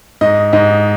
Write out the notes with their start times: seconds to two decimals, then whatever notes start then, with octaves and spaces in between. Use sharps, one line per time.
0.21 G#2 D#5
0.53 G#2 D#5